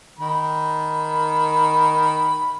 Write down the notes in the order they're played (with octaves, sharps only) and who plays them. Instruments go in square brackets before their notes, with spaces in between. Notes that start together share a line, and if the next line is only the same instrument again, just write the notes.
[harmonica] D#3 B5